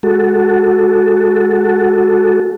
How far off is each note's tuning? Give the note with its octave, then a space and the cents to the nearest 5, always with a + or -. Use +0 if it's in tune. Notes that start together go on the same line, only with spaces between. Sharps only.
G#3 +0 F#4 +0 A4 +0